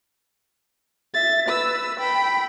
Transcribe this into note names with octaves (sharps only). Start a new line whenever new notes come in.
E5 A6
B4 E6
G5 B5